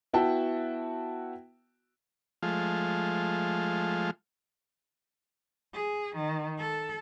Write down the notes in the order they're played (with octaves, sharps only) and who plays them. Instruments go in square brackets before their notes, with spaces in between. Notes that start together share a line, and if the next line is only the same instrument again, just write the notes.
[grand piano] B3 E4 F#4 G5 A5
[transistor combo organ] F3 G#3 A3 F4
[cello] G#4
D#3
A4